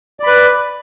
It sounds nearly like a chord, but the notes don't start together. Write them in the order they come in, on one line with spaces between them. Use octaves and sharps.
D5 B5 B4